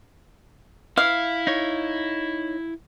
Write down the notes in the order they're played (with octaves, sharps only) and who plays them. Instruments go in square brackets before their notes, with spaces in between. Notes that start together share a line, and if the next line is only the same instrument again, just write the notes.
[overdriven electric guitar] E4 [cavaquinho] F5
[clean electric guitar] D#4 C#5